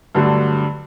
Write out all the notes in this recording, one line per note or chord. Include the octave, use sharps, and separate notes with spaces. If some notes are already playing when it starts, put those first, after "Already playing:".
G2 D3 F#3 A3